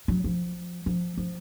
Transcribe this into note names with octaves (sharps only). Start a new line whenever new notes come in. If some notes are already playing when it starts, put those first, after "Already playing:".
F#3
F3
F3
F3